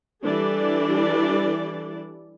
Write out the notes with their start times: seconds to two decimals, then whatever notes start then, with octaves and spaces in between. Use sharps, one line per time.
0.24 E3 G3 D4 A4 D5